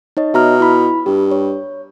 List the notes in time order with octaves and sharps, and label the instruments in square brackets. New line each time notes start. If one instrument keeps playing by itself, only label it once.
[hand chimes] D#4 C#5 D#5
[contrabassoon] B2 [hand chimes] E5 A#5 F6
[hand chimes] E4 B5
[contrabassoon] G2 [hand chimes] G4
[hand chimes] C#5